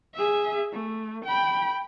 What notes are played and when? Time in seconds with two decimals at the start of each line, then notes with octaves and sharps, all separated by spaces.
0.15 G#4 E5
0.73 A3
1.25 G5 B5